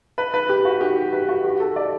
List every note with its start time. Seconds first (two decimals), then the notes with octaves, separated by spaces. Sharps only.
0.18 B4
0.34 B4
0.49 G4
0.65 F#4
0.81 G4
1.13 B4
1.29 F#4
1.44 G4
1.60 A4
1.76 D5